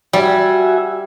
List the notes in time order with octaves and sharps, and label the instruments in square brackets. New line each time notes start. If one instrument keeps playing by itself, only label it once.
[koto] G3 [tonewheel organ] F#4 E5 G#5